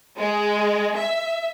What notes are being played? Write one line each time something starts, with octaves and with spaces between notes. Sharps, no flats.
G#3
E5